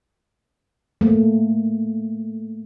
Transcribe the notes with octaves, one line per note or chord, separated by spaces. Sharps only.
A3 A#3